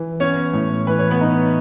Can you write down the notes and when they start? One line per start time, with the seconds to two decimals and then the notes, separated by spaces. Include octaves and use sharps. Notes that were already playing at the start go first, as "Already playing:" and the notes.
Already playing: E3
0.20 B3 C#4 C#5
0.53 A2
0.87 E3 B4
0.99 C#5
1.10 B3 B4
1.21 D#4